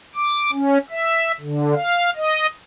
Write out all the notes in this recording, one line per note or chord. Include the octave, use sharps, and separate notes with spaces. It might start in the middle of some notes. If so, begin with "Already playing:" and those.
D6
C#4
E5
D3
F5
D#5